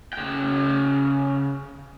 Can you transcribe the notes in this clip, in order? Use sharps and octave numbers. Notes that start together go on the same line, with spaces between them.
C#3 G5